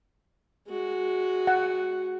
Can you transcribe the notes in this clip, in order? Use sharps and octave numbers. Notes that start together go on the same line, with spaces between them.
G#3 F#4
F#5